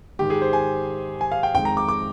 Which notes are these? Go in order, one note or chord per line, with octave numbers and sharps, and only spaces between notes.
G#2 D#3 G#3 G4
G#4
C5
G#5
G#5
F5
G5
F2 D#3 G#3 G5
A#5
D6
D6